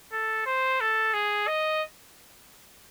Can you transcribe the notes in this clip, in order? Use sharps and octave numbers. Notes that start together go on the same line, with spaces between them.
A4
C5
A4
G#4
D#5